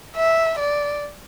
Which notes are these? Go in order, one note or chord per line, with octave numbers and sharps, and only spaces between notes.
E5
D5